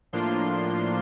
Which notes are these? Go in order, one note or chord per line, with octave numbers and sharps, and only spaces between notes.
A2 F3 A#3 D4 F4 C6